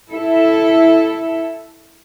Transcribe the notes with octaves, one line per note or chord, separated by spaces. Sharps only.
E4 A4 E5